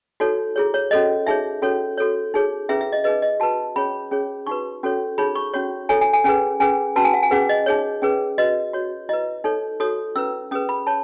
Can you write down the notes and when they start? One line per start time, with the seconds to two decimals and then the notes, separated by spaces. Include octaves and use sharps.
0.20 D#4 F#4 A4 C#5
0.56 E4 G#4 C#5
0.74 C#5
0.91 C#4 F#4 A4 C#5 D#5
1.27 D#4 G#4 C#5 E5
1.62 C#4 F#4 A4 C#5
1.98 F#4 A4 C#5
2.34 D#4 G#4 C#5
2.69 C#4 E4 G#4 B4 E5
2.81 E5
2.93 D#5
3.04 D#4 G#4 B4 D#5
3.22 D#5
3.40 F#4 B4 A5
3.76 C#4 G#4 C#5 B5
4.11 C#4 G#4 C#5
4.47 D#4 F#4 B4 C#6
4.83 C#4 F#4 A4 C#5
5.18 D#4 G#4 C#5 B5
5.35 C#6
5.54 C#4 F#4 C#5
5.89 E4 A4 C#5 G#5
6.01 G#5
6.13 G#5
6.24 C#4 G#4 B4 G#5
6.60 C#4 G#4 B4 G#5
6.96 C#4 F#4 B4 A5
7.04 G#5
7.14 F#5
7.23 G#5
7.31 C#4 G#4 B4 F#5
7.49 D#5
7.66 D#4 G#4 C#5
8.02 C#4 G#4 B4
8.38 F#4 B4 D#5
8.73 F#4 C#5
9.09 E4 B4 D#5
9.44 D#4 A4 C#5
9.80 D#4 F#4 A4 C#5 D#6
10.16 C#4 E4 B4 E6
10.51 C#4 G#4 B4 D#6
10.69 B5
10.87 C#5 A5